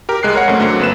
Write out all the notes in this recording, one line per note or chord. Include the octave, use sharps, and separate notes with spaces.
G4 A#4
C2 G#3 F#6 C7
A#4 C#5 F#5
F#2 A3 C4
D3 F#3 A#3 C4
G1 B4 E7